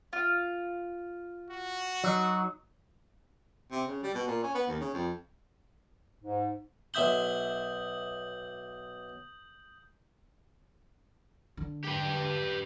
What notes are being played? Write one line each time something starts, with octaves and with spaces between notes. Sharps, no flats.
F4
F#4
F#3 D#4
C3
C#3
G3
B2
A#2
C#4
B3
D#2
C#3
F2
G#2
B1 E5 C6 D#6 G6 F#7
D3
G4 B4